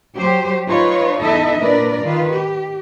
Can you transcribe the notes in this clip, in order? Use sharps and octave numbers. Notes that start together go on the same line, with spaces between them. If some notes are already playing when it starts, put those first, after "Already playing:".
F#3 G4 C5
D#4 F4 B4 C#5
E2 D#4 E4 A4 D#5 E5
A#2 D4 A#4 B4 D5
D#3 F4 B4
G4